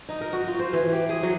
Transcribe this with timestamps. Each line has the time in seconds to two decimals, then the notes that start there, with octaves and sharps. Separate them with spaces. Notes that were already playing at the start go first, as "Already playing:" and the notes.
0.09 D#4
0.21 A#4
0.33 F#4
0.47 F4
0.59 C5
0.73 E3
0.92 G4
1.09 G#4
1.23 F#3